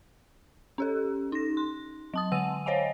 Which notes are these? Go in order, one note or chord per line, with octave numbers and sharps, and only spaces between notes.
C#4 G4 A4
D#4 A#6
C6
F#3 A5 D#6
D3 F#5 G#5 E6 D#7
C5 C#5 D#5 F5 G#5